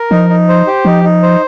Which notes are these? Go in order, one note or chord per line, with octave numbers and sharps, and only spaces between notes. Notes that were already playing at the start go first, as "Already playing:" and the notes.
Already playing: A#4
F3 D#4
D#4
C5
G4
F3 D#4
D#4
C5